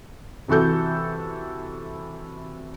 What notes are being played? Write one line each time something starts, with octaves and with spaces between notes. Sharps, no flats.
C3 E3 F#4 A4 G6